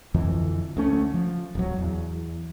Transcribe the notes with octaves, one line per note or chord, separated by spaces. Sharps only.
F2 D3 E3
D2 A3 C#4
F3
D1 F#3
E2